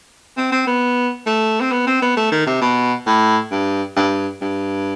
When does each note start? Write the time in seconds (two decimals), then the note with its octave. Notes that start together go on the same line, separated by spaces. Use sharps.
0.37 C4
0.52 C4
0.67 B3
1.27 A3
1.61 C4
1.72 B3
1.87 C4
2.02 B3
2.17 A3
2.32 D#3
2.47 C3
2.61 B2
3.07 A2
3.51 G2
3.96 G2
4.41 G2